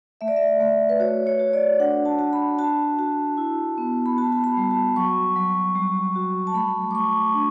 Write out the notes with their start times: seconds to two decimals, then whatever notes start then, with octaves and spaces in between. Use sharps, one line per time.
0.21 A3 E5
0.28 D5
0.36 E5
0.60 A3
0.89 B4
1.00 F#4 C#5
1.27 C#5
1.39 F#4
1.53 D5
1.79 D4 F#5
2.05 A5
2.19 F#4
2.33 B5
2.59 F#4 A5
2.99 F#4
3.38 E4
3.78 B3
4.06 B5
4.18 F#4 A5
4.32 A5
4.44 B5
4.57 G3
4.71 A5
4.96 F#3 C#6
5.36 F#3
5.75 G3
6.16 F#4
6.47 A5
6.55 A3 B5
6.91 D6
6.94 A3 C#6
7.34 D4